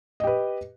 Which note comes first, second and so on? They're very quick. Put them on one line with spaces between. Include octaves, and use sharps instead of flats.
D#5 G4 B4